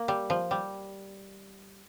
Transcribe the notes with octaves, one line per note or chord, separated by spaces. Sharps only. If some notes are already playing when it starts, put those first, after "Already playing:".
Already playing: A#3
G3
F3
G3